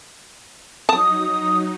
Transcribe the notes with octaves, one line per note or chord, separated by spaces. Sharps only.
F#3 D#4 A5 D#6